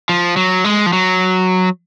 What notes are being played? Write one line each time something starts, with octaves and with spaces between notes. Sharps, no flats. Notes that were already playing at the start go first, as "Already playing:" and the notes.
F3
F#3
G#3
F3
F#3